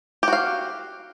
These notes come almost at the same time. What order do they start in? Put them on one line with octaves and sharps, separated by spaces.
G4 F#4 F5